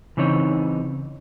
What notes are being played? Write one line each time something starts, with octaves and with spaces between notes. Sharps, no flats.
C#3 E3 C4 D#4 C#5